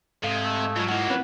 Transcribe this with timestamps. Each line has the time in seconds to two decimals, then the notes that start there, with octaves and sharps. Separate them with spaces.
0.23 G#2 C3 A4 D#5 F5 G#5
0.42 A3
0.76 E3 F#3 F4 F6
0.89 F#3 A#3 E4 F#5
1.10 C4 C#4 B4 C#5